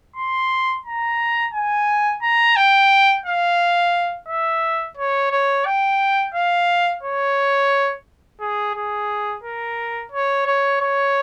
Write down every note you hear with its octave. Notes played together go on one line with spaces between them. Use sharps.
C6
A#5
G#5
A#5
G5
F5
E5
C#5
C#5
G5
F5
C#5
G#4
G#4
A#4
C#5
C#5
C#5